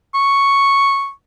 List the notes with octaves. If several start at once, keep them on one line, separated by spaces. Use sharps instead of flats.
C#6